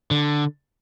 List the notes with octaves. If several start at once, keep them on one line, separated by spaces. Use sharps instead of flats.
D3